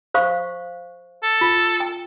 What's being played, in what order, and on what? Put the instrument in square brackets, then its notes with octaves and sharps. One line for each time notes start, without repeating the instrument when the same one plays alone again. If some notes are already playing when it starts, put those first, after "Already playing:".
[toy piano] C5 F5 C#6
[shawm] A4
[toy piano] F4
G5